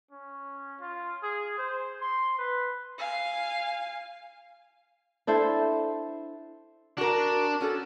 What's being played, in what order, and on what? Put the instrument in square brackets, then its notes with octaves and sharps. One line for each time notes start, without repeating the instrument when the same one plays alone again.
[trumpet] C#4
F4
G#4
C5
C6
B4
[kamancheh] F5 G#5
[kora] D4 E4 A4 C5
[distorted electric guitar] D4 [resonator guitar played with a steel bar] F#4 A#4
[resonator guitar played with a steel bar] C#4 F#4 A4